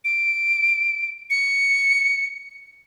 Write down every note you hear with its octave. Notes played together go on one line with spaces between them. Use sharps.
D7
C#7